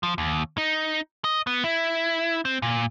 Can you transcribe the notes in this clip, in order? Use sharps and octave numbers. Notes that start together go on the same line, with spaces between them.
F3
D#2
D#4
D#5
B3
E4
C4
A#2